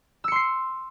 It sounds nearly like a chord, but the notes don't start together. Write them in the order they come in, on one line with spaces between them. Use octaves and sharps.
E6 C#7 C6 C7